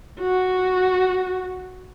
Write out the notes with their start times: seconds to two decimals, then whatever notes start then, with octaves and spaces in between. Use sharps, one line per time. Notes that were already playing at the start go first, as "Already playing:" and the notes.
0.20 F#4